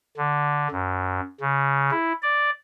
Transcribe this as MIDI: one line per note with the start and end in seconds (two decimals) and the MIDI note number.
0.17 0.68 50
0.71 1.20 42
1.41 1.91 49
1.91 2.12 64
2.22 2.50 74